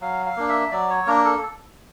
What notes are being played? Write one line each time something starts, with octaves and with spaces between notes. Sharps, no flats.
F#3 F5
F5
A#3 D4
E5
F#3 D5
C#5
A#3 D4 A#4
A4